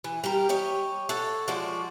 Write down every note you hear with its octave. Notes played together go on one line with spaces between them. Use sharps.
E3
G3 G4 A#4
G4 C#5 D#5
A4 C#5 F#5
F3 G#3 F#4 D5